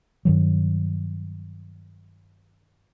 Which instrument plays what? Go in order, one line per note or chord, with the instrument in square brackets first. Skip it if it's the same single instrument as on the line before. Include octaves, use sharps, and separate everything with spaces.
[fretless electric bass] G2 D#3 F#3